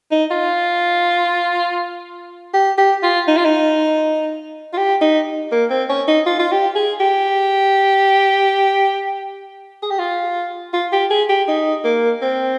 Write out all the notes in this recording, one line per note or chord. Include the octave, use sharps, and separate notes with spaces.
D#4
F4
G4
G4
F4
D#4
F4
D#4
F4
G4
D#4
A#3
C4
C#4
D#4
F4
F4
G4
G#4
G4
G#4
G4
F4
F4
G4
G#4
G4
D#4
A#3
C4